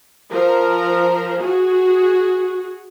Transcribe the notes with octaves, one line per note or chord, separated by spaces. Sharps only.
F3 A#4
F#4 G#4